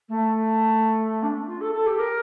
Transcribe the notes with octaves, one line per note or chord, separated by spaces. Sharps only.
A3
D4
F4
A4
A4
G4
A#4